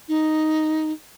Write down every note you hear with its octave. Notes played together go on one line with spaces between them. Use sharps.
D#4